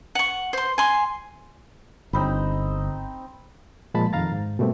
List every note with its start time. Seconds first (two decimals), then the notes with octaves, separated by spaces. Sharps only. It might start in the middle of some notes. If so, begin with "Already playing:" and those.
0.15 F#5 C#6
0.53 C5 C6
0.78 G#5 C6
2.13 G1 C4 D#4 B5
3.94 A#2 F3 G#3 A5 B5
4.13 F2 D#3 F5 A#5 A6
4.32 G#2
4.59 B2 G3 A3 A#3 C4